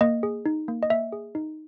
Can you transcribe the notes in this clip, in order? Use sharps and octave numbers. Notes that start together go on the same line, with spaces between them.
A#3 D#5
G#4
D#4
A#3
D#5
A#3 E5
G#4
D#4